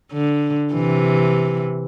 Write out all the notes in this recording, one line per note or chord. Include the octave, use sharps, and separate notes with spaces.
D3
C3 E3